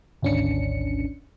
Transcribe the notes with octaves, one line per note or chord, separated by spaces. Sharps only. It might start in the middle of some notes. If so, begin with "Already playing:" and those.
G#1 D2 C#4 D4 C#7